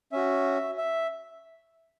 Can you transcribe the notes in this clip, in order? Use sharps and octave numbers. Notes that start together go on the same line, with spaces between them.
C#4 F#4 E5
E5